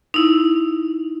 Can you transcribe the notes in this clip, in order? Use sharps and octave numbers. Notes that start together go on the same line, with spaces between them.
D#4 E4